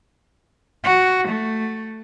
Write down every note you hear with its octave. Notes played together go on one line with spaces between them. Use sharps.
F#4
A3